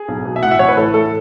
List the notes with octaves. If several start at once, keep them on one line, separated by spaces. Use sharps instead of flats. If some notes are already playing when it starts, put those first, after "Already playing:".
Already playing: G#4
B1
B2
E5
A1 F#5
E5
E3 C#5
B4
A2 A4
A2 A4